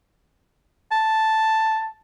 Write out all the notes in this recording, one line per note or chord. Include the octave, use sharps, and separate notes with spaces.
A5